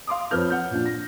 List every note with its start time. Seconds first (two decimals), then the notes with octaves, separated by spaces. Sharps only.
0.07 F5 C6 D6 D#6
0.31 F2 F3 B4 C#5 F6 G6
0.50 F#5 G6
0.71 A#2 F3 D4
0.86 A#6